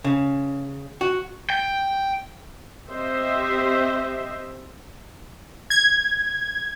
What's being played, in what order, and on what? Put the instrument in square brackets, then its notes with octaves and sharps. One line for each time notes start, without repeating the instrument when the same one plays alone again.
[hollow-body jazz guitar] C#3
F#4
[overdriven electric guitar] G5
[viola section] C4 G4 C5 D#5 E5
[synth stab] G#6